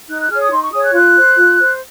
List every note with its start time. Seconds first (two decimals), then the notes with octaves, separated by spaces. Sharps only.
0.08 D#4 F#6
0.19 F#6
0.30 G#4 C#5 F6
0.40 D#6
0.51 D#4 C6
0.62 C#6
0.72 G#4 C#5 D#6
0.82 F#6
0.93 F4 F#6
1.14 C5
1.36 F4
1.57 C5